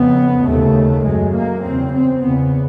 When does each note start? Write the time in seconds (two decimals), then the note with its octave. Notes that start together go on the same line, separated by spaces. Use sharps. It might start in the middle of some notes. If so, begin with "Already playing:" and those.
Already playing: F2 C#3 B3
0.45 D#2 C#3 A3
1.04 F#2 C#3 G#3
1.34 A#3
1.63 E2 C#3 C4
1.92 C4
2.21 E2 C#3 B3